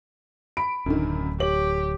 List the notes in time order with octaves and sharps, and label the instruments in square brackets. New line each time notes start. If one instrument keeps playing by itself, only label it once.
[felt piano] B5 [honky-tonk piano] D7
[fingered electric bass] D1 [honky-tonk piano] F#2 D3 D#3
[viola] G4 [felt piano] C#5 [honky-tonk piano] F#7